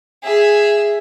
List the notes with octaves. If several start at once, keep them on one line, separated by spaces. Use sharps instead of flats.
G#4 E5